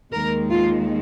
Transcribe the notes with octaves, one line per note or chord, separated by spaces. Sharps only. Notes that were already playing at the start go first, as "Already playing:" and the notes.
D#2 D#3 G#3 A#4
F4